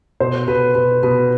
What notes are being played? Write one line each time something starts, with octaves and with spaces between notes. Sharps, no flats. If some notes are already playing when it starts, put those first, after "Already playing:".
B2 C5
B2 B4
B2 B4
B2 B4